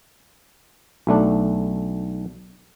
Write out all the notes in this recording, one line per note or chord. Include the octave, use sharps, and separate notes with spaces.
B1 A3 D4